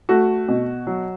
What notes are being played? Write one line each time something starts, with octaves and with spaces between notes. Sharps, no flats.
A3 F#4
B2
F#3